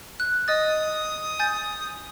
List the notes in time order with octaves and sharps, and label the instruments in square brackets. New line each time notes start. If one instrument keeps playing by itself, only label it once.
[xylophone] F#6
[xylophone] D#5 A6 [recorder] D#6
[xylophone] G#5 G6 A6